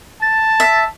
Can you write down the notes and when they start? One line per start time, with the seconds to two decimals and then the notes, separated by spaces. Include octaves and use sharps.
0.22 A5 A6
0.60 E5